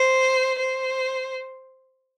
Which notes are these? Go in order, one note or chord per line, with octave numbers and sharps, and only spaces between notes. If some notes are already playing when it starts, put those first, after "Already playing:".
Already playing: C5
C5